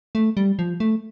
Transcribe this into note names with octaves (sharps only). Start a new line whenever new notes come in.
A3
G3
F3
A3